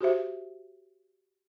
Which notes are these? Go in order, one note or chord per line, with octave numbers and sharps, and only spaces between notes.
F#4 G4 C5 E5